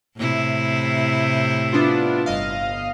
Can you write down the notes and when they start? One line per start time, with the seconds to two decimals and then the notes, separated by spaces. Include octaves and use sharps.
0.17 A2 C3 E4
1.73 B3 D4 F4
2.26 G1 D#5 F5